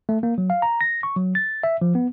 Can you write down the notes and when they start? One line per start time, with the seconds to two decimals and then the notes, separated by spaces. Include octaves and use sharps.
0.09 A3
0.23 A#3
0.38 F#3
0.50 F5
0.62 A#5
0.81 A#6
1.03 C#6
1.16 F#3
1.35 A6
1.64 E5
1.82 F3
1.95 B3